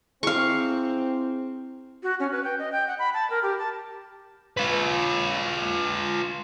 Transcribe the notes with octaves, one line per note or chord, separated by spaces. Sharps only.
C4 E4 G#4 F5 C#6
F#4
C#4
B4
G5
D#5
G5
F#5
B5
A5
A#4
G4
A5
F4 B4